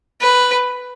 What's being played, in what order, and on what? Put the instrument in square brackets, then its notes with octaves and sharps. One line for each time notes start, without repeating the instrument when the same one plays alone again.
[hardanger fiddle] B4